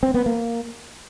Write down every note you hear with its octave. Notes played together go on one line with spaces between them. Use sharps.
C4
B3
A#3